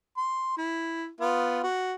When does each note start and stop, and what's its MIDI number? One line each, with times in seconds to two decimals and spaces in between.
0.17 0.55 84
0.57 1.09 64
1.21 1.61 59
1.21 1.61 65
1.63 1.95 66